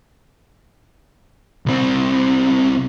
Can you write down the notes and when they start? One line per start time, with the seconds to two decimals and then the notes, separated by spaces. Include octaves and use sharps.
1.66 C2 C4